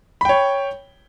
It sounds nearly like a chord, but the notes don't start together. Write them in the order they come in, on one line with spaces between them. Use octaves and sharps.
B5 G5 C#5